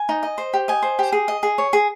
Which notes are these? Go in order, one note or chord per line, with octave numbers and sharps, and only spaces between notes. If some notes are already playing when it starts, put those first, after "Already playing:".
Already playing: G#5
D#4
D#5
C5
G4
D#5 G#5
C5
G4
G#4
D#5
G#4
C#5
G#4